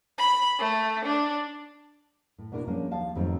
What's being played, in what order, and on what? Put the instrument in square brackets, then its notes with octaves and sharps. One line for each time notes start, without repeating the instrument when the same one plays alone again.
[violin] B5
A3
D4
[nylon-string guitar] A2
B2 A#3 D4 E4 A#4
F3 G#3 A#3 C#4 D4
D#2 F3 F5 A5
F2 G#2 D#3 F#3 A3 C4